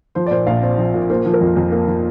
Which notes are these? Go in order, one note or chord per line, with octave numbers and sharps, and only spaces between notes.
F3 C5
D5
A#2 C5
A#1 F5
C4 D5
F3
A#2
A#3 C5
F3
A#4
F2
F2
A#3
F3